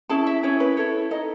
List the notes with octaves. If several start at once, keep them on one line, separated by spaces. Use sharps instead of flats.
C#4 E4 G#4 A5
E5
C#4 E4 G#4 C#5
B4
E4 A4 C#5
D#4 A4 D#5